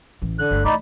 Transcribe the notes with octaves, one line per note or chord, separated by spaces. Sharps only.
A1 E3
D3 F#6
G1 A3
E3 A3 D#4 D5 B5